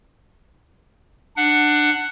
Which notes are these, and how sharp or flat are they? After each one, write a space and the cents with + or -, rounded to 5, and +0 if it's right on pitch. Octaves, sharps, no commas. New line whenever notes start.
D4 +20 F#5 +0